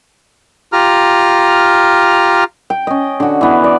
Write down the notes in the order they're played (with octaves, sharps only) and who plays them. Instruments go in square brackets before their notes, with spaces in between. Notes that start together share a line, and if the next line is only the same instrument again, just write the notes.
[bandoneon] F4 G4 A#5 F6
[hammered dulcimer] G5
C#4 D#5
D3 F#4
E3 B3
D5